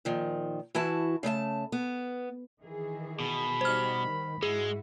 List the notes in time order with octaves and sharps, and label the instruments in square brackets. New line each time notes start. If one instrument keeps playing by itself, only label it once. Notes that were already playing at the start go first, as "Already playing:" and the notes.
[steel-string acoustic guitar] A#2 D#3 F3
E3 E4 F#4 A5
C#3 A3 D#5 A5
B3
[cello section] D#3 E3 G#4
[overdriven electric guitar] B2 [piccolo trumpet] B5
[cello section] G3 D#4 G4 [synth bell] C5 F6
[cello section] D#3
[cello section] G#2 E4 F#4 [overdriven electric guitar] G#3 [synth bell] G#4